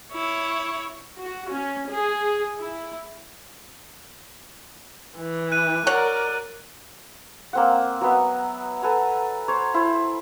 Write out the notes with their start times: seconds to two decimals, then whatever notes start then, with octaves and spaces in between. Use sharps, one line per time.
0.13 E4 C#5
1.20 F#4
1.51 C#4
1.90 G#4
2.58 E4
5.16 E3
5.52 F#6 D#7
5.87 F#4 A#4 C#5 D5 F#5
7.53 A#3 C4 F#5
8.01 F#3 B3 E5
8.82 A4 B4 G#5 A#5
9.48 C5 C#5
9.74 E4 C5